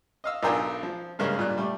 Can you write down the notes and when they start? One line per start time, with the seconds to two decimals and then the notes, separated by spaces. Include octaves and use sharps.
0.24 D#5 F5 E6
0.43 B1 D4 F4 A#4 G5 G#5
0.83 F3
1.19 G2 C#3 G#3 A#3
1.36 G2 A#2 F#6
1.58 G3 A3